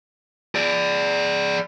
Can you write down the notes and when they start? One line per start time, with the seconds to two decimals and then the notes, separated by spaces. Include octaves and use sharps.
0.55 G#4 D5